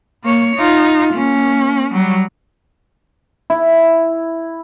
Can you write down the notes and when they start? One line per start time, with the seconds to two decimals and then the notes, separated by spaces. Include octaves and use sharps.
0.24 A#3 C#5
0.56 D#4 F4
1.14 A#3 C#4
1.93 F#3 G3
3.50 E4